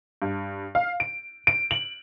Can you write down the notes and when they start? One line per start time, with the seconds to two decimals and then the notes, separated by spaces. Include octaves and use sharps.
0.22 G2
0.75 F5
1.00 D7
1.47 D7
1.71 F#7